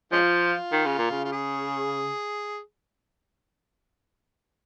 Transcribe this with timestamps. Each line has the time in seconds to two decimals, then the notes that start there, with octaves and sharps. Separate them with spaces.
0.12 F3 G#3 C#4 F4
0.72 D#3
0.85 C#3
0.98 A#2
1.11 C#3
1.25 F4
1.32 G#4